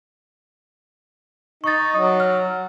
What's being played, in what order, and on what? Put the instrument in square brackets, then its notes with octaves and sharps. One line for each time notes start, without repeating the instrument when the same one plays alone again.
[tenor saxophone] D#4 [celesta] C#6 A6
[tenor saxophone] F#3
[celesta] F6